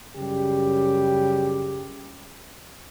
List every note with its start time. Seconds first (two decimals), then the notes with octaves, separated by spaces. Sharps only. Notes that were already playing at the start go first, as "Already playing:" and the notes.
0.16 F#2 C#3 G3 G4